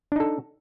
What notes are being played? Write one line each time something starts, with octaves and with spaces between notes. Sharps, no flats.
D4 D#4 A4